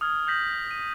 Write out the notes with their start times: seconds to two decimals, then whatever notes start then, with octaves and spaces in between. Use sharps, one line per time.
0.01 D#6 F6 G#6
0.27 D#6 F6 G6 A#6 B6 F#7
0.71 D#7